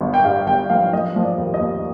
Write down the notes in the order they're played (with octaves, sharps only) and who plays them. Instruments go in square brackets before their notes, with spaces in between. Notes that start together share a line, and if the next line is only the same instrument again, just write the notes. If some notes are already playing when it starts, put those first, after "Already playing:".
[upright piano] G1
G5
G2 F5
G1 G5
F3 F5
F3 D#5
F3
D5
D#2
D#5
D#2